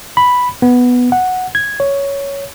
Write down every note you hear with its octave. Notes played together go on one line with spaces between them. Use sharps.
B5
B3
F#5
G#6
C#5